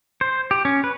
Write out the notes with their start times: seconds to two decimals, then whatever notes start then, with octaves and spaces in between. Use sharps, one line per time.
0.21 C5
0.51 G4
0.65 C#4
0.84 B4